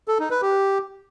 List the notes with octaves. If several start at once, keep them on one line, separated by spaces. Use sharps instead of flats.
A4
D#4
B4
G4